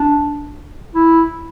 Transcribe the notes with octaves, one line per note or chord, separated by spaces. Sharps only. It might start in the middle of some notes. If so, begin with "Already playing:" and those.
Already playing: D4
E4